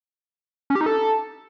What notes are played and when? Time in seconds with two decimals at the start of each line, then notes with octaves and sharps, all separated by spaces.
0.70 C#4
0.75 G4
0.81 D#4
0.86 A4